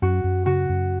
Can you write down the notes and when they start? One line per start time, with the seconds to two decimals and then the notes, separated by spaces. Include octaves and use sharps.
0.02 F#2 F#4
0.24 F#2
0.46 C#3 F#4
0.69 F#2